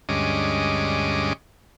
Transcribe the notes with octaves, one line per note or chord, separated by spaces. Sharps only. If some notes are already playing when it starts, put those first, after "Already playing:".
D2 G2 G#3 C#4 D#5 D6